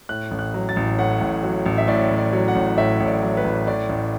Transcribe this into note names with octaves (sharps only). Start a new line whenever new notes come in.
A2 F#6
A1
F#6
F#3
A6
A1
A2 F#5
A1
F#3
A1
E5
A2 D5
A1
D5
F#3
F#5
A1
A2 E5
A1
D5
F#3
B4
A1
A2 D5
A1